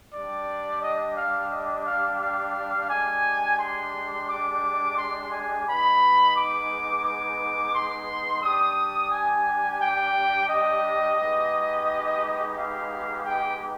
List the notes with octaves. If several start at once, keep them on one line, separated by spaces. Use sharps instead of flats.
G3 D4 G4 D5
D#5
F5
D#5
F5
F5
G#3 D4 G4 G#5
C6
D6
C6
G#5
G#3 B3 D#4 B5
D6
D6
C6
G3 D4 G4 D#6
G#5
G5
D#5
G#3 B3 D#4 G4
F5
G5